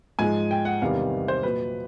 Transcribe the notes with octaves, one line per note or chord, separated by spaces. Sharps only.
G#2 F3 G#3 G#5
G5
F#5
E2 C3 D#3 G3 F5
C5
A#2 F#3 B4